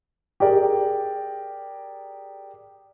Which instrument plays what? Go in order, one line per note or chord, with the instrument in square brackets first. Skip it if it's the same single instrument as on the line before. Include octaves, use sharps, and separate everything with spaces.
[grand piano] G4 G#4 A#4 D5